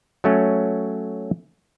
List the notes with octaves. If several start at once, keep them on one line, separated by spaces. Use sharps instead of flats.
F#3 A3 C#4